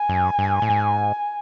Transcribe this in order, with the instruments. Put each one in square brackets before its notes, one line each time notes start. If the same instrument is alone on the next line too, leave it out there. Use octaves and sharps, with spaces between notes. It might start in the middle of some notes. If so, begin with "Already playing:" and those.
Already playing: [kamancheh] G#5
[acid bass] F#2
G2
A2
G#2